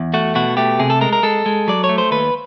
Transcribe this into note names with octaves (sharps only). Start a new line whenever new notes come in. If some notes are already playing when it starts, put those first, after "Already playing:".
Already playing: E2
A3 F#4
B2 F#4
A3 G4
C3 G#4
A4
G#3 A#4
A#4
G#3 A4
G#3
F#3 D5
C#5
A3
C5
D#2 B4